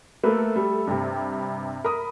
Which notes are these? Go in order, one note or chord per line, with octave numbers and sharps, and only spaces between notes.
A3 A#3 A4 B4
G3
G2 C3
A#4 B5 D#6